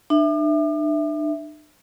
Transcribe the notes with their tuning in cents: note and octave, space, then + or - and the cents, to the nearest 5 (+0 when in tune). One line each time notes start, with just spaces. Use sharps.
D4 +40 E5 +0